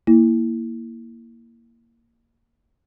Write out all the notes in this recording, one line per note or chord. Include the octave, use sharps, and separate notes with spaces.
A#3 E4